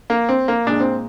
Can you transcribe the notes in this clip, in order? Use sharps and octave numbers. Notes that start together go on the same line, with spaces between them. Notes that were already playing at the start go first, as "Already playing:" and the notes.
A#3
C4
A#3
A#2 G#3 D4
C4